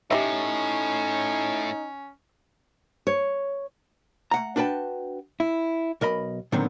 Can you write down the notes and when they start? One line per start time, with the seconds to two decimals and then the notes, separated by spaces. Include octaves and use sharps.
0.11 A2 C#4 D#4 G4 D#5 E5
3.07 C#5
4.31 A3 F#5 A#5
4.56 D4 F#4 B4 G5 A5
5.40 E4
6.01 B1 A#4 D#5 B5
6.52 A#2 D3 D#3 F#3 B3 C4